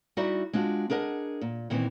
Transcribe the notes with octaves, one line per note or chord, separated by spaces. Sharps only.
G3 D#4 E4 F#4 D5 E5
G#3 D4 F4 F#4
D4 G#4 A#4 D#5 F#5
A#2
A#2 D#3 E3 B3 C4